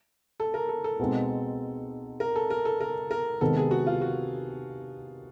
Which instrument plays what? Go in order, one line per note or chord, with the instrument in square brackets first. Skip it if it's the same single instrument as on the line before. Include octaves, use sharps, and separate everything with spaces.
[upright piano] A4
A#4
A4
A4
[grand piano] B2 G#3 C4 D#4
[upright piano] A#4
A4
A#4
A4
A#4
A#4
[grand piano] C3 D#3 G#3 B3 [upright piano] A4
[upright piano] G#4
F#4
F4
F#4